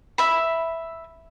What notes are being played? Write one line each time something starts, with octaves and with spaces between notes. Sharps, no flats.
E5 B5